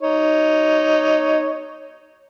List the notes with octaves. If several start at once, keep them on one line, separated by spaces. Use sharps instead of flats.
D#4 C#5